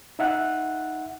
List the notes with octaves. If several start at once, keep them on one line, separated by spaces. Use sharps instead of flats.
D#4 E5 F#5 F#6